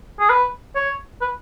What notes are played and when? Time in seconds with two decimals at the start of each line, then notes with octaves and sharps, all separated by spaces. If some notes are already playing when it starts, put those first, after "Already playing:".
0.20 G#4
0.30 B4
0.76 C#5
1.21 B4